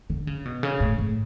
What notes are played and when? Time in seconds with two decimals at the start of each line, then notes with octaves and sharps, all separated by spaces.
0.10 D3
0.27 C#3
0.45 B2
0.63 C#3
0.81 A2
0.98 A2